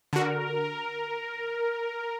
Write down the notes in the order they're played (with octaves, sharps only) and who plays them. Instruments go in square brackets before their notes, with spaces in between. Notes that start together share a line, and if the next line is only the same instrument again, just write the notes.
[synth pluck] D3 F#4 [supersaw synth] A#4